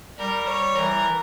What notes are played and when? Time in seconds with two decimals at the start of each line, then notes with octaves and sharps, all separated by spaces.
0.18 G3 A#4
0.46 C#5
0.75 E3 A#4